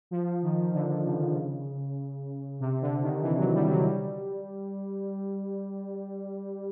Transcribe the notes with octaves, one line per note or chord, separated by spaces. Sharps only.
F3
D#3
D3
C#3
C3
D3
D#3
E3
F#3
G3
F#3
F#3
G3